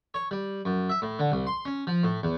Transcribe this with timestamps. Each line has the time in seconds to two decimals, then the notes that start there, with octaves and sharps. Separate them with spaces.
0.14 C#5
0.31 G3
0.65 F#2
0.89 E5
1.02 A2
1.19 D3
1.32 C2
1.47 C6
1.65 C#4
1.87 F3
2.04 A2
2.23 E2